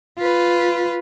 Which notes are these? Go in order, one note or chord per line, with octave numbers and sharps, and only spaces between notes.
F4 B4